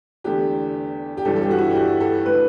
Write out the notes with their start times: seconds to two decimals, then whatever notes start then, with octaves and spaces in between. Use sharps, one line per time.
0.24 E2 D3 A3 G4
1.17 G4
1.25 G1 G2 E3 G3 A4
1.36 A4
1.42 G4
1.51 F#4
1.58 E4
1.71 G4
1.75 F#4
2.00 A4
2.26 D3 A3 B4